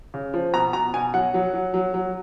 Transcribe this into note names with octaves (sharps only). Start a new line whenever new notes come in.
C#3
F3
B2 A#5
B2 A#5
B2 G#5
F#3 F#5
F#3
F#3
F#3
F#3